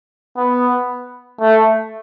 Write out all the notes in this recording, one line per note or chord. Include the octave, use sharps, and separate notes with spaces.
B3
A3